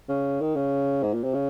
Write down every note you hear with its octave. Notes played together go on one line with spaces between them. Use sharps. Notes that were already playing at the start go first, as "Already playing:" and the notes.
C#3
D#3
C#3
G#2
A#2
C3
C#3